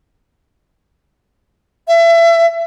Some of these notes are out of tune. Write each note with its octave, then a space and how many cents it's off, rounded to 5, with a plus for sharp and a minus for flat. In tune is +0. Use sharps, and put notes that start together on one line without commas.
E5 +30